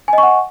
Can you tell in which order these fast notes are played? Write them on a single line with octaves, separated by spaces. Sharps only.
G#5 D#5 C#6 F#5